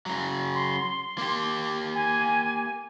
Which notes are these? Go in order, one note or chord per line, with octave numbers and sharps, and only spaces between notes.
C#3 F#3
C6
A#3 G4
G#5